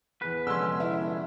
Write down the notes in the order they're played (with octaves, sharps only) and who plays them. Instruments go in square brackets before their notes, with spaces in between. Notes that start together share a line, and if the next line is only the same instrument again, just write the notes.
[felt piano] E2 G#4 [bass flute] B3 [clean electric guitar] B4
[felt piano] F1 [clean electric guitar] D3 G#3 C#4 [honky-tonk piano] C6 E6
[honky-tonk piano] E4